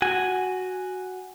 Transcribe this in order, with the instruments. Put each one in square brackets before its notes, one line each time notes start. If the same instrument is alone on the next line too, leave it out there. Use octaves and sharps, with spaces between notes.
[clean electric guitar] F#4 G#5